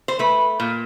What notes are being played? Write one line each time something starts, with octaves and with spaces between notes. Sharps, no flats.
C5
A3 B4
A#2